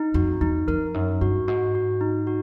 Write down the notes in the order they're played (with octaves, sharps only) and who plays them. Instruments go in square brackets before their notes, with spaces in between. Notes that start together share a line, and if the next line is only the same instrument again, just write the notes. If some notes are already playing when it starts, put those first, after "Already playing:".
Already playing: [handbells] D#4
[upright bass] F2 [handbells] F#4
[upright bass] E2 [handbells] D#4
[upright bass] F2 [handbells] A#4
[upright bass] F#2 [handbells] D#4
[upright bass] G2 [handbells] F#4
[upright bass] G#2 [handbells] F#4
[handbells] F#4
D#4
F#4